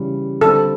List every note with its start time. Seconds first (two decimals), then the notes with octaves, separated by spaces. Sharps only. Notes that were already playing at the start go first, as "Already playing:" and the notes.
Already playing: C#3 E3 G3
0.41 D3 G3 C4 A4